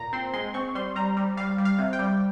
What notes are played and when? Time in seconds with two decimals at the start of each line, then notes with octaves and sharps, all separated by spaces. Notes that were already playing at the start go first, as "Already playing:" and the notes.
Already playing: A#2 A#5
0.13 C4 C6
0.33 G#3 C6
0.54 C4 C#6
0.75 G3 C6
0.95 G3 A#5
1.17 G3
1.37 G3 F5
1.58 G3
1.65 F5
1.79 C3
1.93 G5
1.99 G3